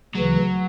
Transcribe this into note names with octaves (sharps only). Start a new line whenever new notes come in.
D2 C#3 E3 F#3